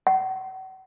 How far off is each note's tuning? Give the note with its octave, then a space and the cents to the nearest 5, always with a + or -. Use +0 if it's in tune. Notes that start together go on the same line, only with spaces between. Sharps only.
F#5 +40